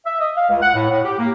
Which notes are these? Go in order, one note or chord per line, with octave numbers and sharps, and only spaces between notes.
E5
D#5
F5
C#2
F#5
A2
A2
G4
A#3